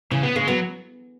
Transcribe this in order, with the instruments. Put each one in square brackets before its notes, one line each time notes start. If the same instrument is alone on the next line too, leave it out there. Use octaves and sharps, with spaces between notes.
[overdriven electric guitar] C#3 [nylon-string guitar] E3
[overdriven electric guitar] B3
[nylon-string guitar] C#3 [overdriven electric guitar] G#3
[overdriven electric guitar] F#3 [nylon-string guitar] B3